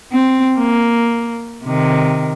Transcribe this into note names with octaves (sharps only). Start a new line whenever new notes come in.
C4
A#3
C3 D#3